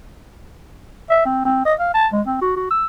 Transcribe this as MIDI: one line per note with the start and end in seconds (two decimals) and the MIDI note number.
1.10 1.24 76
1.26 1.44 60
1.45 1.63 60
1.65 1.74 75
1.80 1.92 77
1.94 2.07 81
2.13 2.21 56
2.27 2.37 60
2.41 2.54 66
2.56 2.66 66
2.71 2.87 88